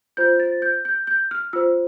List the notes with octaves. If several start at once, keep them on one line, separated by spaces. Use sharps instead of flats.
F4 C5 G6
A6
G6
G6
G6
F6
F4 C5 E6